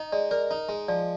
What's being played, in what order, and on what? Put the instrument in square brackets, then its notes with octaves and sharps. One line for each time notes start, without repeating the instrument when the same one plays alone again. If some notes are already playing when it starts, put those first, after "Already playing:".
Already playing: [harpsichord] D#4 [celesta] D#5
[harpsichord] G#3 [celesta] D5
[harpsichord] A#4 [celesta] D5
[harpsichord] D#4
G#3
[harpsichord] F3 [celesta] D5